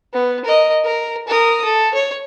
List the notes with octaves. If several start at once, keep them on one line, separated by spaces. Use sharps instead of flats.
B3
A#4 D#5
A#4
A#4 D#6
A4
C#5